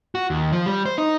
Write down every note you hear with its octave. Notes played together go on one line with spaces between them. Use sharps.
F#4
D#2
F3
G3
C5
D#4